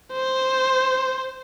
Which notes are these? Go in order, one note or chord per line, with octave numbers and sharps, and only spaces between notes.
C5